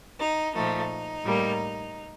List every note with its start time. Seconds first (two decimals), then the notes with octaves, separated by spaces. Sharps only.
0.19 D#4
0.54 A#2 F3 A3 D#4
1.24 A2 G3 A#3